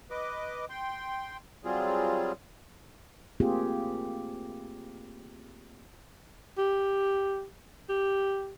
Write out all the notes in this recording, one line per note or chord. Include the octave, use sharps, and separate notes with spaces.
B4 D#5 D6
G5 C6
F#3 G3 C4 F4 G#4
A3 A#3 C4 F4 G4 G#4
G4
G4